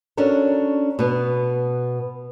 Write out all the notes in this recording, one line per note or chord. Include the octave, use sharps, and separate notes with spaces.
C#4 D4 F#4 A4 A#4
B2 B3